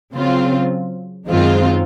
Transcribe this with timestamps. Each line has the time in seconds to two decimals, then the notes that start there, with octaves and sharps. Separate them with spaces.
0.14 C#3 F#3 C4 F4
1.28 F#2 D#3 G#3 C4 F4